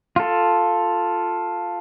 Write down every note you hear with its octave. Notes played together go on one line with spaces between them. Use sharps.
F4 A4